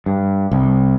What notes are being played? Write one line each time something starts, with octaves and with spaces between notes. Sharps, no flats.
G2
C2